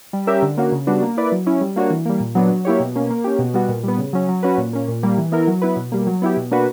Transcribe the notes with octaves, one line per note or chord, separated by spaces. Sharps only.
G3
C#4 G4 A#4 E5
D3
A#3 C#4 F#4
C#3
G3 B3 D4 F#4
A#3
E4 B4 D5
F#3
C#4 E4
G3
A#3 D4 F#4 C#5
E3
G3 A#3
A#2
F#3 B3 D4
F#3
A#3 E4 G4 C#5
B2
A#3 C#4
A#3
C#4 G4
B2
G3 B3 F#4
A#2
G3 B3
C#3
F#3 C#4
F#3
C#4 F#4 B4
A#2
A#3 C#4
A#2
G3 A#3
E3
B3 E4 A#4
F#3
B3 E4 B4
B2
G3 A#3
F#3
B3 E4 G4
B2
A#3 D4 F#4 B4